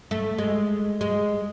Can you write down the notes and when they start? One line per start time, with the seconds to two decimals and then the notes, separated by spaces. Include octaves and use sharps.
0.11 A3
0.38 G#3
1.01 G#3